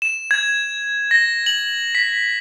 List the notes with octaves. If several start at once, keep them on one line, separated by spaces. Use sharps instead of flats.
E7
G#6
A#6
F#7
B6